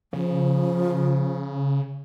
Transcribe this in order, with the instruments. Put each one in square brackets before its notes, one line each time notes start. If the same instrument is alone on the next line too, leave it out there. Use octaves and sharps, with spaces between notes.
[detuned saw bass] C#3 [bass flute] F3